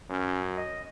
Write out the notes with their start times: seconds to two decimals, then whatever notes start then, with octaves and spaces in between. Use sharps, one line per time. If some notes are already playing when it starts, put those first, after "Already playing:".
0.10 F#2 C#4
0.57 D#5